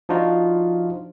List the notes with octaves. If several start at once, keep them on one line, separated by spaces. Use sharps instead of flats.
F3 D4 D#4 F4 F#4